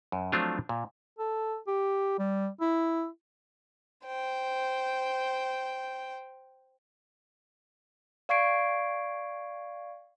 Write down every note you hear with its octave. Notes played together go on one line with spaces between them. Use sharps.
F#2
F3 F#3 A3 C4 D4 F4
A#2
A4
G4
G3
E4
C5 G5
D5 F5 C#6 G#6 C7 D7